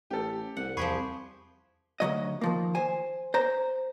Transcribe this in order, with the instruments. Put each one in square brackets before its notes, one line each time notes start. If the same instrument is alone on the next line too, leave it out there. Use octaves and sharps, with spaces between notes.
[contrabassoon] A1 [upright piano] G4 A4
[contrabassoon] C2 [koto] F#5
[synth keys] E2 B5 C#6 [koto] F3 G4 G#4
[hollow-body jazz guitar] D2 B2 F#3 D#5
D#3 F3 A#3
C5 G#5
C5 A#5